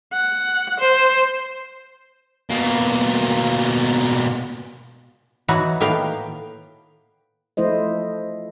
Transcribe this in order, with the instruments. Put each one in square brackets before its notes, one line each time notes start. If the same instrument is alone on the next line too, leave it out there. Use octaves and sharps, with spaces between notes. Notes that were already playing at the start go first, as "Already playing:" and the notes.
[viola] F#5
C5
[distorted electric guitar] B2 A#3
[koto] E3 F#3 B3 D#4 F#4
A2 D#3 A#3 B3 F5 G5
[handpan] F3 A3 E4 C5 D#5